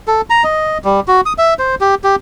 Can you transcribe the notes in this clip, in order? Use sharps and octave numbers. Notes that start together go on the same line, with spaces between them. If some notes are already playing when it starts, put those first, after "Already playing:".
A4
A#5
D#5
G3
F#4
D#6
E5
C5
G4
G4